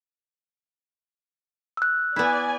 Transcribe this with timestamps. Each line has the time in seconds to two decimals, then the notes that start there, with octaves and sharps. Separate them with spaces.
1.77 E6 F#6
2.16 B3 E4 D5 G#5